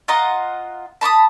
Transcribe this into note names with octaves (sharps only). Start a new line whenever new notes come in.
F4 D#5 F#5 A#5
A5 B5 C#6 D#6